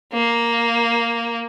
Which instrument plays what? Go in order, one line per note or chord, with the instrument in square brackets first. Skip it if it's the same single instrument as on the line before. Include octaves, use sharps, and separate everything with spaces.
[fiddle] A#3